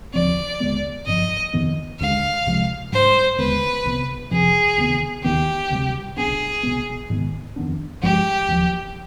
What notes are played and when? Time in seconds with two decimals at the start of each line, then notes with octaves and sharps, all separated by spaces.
0.14 D#2 D3 F3 C4 D5
0.60 D2 D3 G#3 B3
1.06 G1 G2 F3 D#5
1.53 G1 F2 D#3 B3
2.00 D2 D3 G#3 F5
2.46 C2 C3 F3 G#3
2.92 G#2 G3 D4 C5
3.38 D#2 D3 G#3 B3 B4
3.85 C2 C3 D#3 B3
4.31 F1 F2 C3 F3 G#4
4.78 D2 C3 D#3 B3
5.23 D#2 D#3 B3 G4
5.70 D2 C3 G3
6.17 B1 B2 B3 D4 G#4
6.63 B1 B2 G#3 B3
7.10 G#2 D#3 B3
7.56 F2 D#3 B3 D4
8.02 G#1 G2 F3 G#3 G4
8.48 D#2 D3 F3